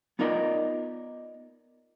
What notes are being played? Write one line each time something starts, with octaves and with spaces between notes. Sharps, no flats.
B3 D#4 F4 A#4 D5 D#5